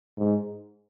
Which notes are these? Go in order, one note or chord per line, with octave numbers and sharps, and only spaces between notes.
G#2